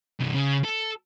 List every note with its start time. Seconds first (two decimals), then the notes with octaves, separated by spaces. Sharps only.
0.19 C2 G2
0.34 C#3
0.64 A4